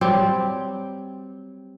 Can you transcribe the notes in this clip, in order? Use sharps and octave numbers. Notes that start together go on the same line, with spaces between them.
F#3 G3 C4 G4